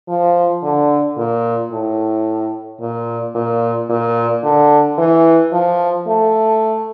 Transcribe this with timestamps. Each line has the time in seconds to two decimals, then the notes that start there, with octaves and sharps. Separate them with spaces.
0.08 F3
0.63 D3
1.17 A#2
1.72 A2
2.80 A#2
3.35 A#2
3.89 A#2
4.43 D3
4.98 E3
5.52 F3
6.07 A3